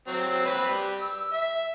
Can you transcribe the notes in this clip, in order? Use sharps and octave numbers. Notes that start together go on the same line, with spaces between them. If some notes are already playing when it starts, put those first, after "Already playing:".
F#3 C4
C4 B4 B5
G3
E6
E5